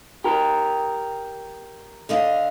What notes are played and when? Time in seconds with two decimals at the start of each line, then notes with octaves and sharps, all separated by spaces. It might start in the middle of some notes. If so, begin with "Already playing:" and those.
0.24 G4 A#4
2.09 D3 D#5 F5